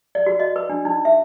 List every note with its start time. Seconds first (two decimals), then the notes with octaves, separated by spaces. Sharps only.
0.15 D5
0.26 F#4
0.40 D#5
0.56 B4
0.69 D4
0.85 D#4
1.05 E5